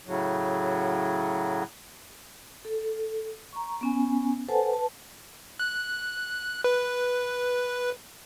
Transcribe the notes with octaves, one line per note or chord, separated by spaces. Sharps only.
A2 C#3 F#3
A4
A#5 C#6
B3 C#4 G#5
A4 B4 C5 F#5 G#5 A5
B4 A5
F#6
B4